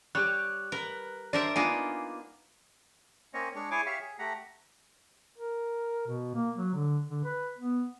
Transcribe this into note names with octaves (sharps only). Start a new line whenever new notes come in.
G3 G4 C#5 F#6
A#4 B4
G3 D4 A#4 C5 D5 E5 D7
A#3 B3 D4 D#4 F4 G#5 C7
A#3 C4 C#4 C#5 D#5
G#3 D4 C#5
E4 G#4 C#5 G#5 D6
G4 C#5 E5 F5
G#4
A3 G4 F#5 A#5
A#4
B2
A#3
F#3
D3
D3
B4
B3